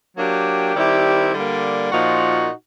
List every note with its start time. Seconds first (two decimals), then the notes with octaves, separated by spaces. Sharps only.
0.17 F#3 A#3 D4 G4
0.75 D#3 G3 C4 E4 G4
1.33 D3 G3 A#3
1.92 A#2 F3 A#3 D#4 F#4